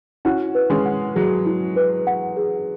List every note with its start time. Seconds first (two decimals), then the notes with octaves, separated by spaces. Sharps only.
0.25 C#4 E4 F#4
0.55 B4
0.70 G#3 C#4
0.86 F#5
1.16 F#3 G#4
1.46 E4
1.76 B4
2.07 F#5
2.37 G#4